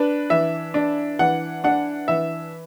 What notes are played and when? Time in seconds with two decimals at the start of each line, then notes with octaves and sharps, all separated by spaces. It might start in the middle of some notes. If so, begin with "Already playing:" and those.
Already playing: D4 B4
0.30 E3 E5
0.74 D4
1.19 E3 F#5
1.64 D4 F#5
2.08 E3 E5